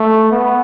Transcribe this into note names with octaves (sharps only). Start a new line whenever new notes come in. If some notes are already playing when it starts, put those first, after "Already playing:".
Already playing: A3
B3